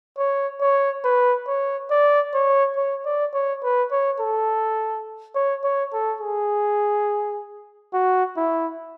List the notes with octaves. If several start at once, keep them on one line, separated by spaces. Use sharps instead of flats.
C#5
C#5
B4
C#5
D5
C#5
C#5
D5
C#5
B4
C#5
A4
C#5
C#5
A4
G#4
F#4
E4